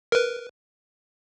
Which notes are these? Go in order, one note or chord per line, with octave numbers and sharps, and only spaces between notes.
A#4 B4